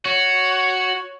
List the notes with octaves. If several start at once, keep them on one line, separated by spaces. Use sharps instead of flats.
F#4 C#5